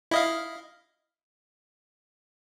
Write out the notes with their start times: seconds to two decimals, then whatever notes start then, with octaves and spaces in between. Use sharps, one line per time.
0.11 E4 D#5 F5